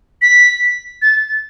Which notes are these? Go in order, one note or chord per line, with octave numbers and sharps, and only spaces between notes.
B6
A6